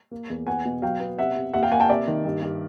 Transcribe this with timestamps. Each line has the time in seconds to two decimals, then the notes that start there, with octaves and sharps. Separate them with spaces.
0.11 A#3
0.30 E2
0.47 B3 F#5 G#5
0.65 B2
0.82 F#3 F5 G5
1.00 B3
1.18 C3 E5 F#5
1.36 C3
1.53 D#2 E5 F#5
1.63 F5 G5
1.72 A#3 F#5 G#5
1.80 G5 A5
1.89 C3 D5 E5
2.08 D#3
2.25 G2
2.42 G2